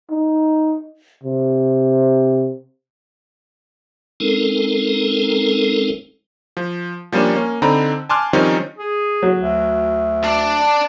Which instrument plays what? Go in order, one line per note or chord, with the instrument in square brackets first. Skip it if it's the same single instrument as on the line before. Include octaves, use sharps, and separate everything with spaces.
[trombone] D#4
C3
[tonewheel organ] G#3 C4 C#4 D#4 A4 A#4
[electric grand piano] F3
F3 G3 A#3 C#4 D4
A#3 C#4
D3 C4 D#4 A#5 B5
G#5 A5 C6 D6 F6 F#6
D#3 F3 G3 C4 C#4 D#4
[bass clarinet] G#4
[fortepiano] F#3
[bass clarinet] D2
[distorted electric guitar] D4 D5